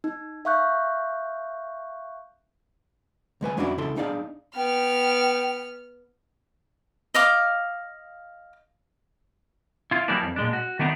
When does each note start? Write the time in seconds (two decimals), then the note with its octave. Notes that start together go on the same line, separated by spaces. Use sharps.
0.04 D#4
0.45 E5 F5 C#6 F#6 G6
3.41 D2 G#3 B4 G#5
3.57 F2 C#4 D4 E4 F#4 D5
3.78 C#2 C#3 E4 A4 C6
3.96 B3 D4 D#4 G#4 D5 F5
4.56 B3 G5 F6
7.15 D#5 F5 D6
9.91 E4 F4
10.08 E3 F#3 G3 A#3 B3 D4
10.22 F2
10.36 A#2 G#3 D4
10.53 F#4
10.79 D#3 A3 B3 D4 D#4